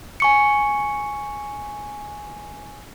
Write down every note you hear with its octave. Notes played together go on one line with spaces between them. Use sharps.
G#5 C#6 C#7